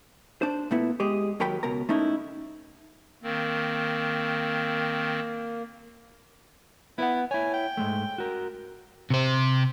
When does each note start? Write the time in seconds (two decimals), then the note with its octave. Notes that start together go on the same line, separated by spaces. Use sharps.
0.42 D4 C5
0.71 A#2 A3 B3 E4
1.00 G#3 G4 G#4
1.40 D#2 F#3 A#4 G5 B5
1.63 C#2 B2 A#4 A#5
1.89 A3 C#4 D#4 E4
3.23 D#3 A#3 C4
6.98 B3 E4 B4 F#5
7.31 E4 C#5 G#5
7.54 G5
7.77 G#2 G#3 A3
8.18 F#4 A#4
9.10 C3 C5